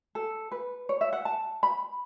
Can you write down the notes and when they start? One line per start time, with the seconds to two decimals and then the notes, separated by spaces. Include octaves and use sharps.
0.15 A4
0.52 B4
0.89 C#5
1.01 E5
1.13 F#5
1.25 A5
1.63 B5